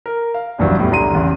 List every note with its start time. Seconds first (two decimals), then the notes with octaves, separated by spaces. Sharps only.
0.06 A#4
0.34 F5
0.58 A#1 E2 G2 C#3 E3 F#3
0.78 E2 A2 G3 B3
0.91 C2 D3 A#5 C6 D#7
1.13 A1 E2 C#3